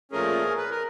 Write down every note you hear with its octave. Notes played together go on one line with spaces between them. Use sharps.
A#2 F3 A3 C#4 G#4 A#4
B4
A#4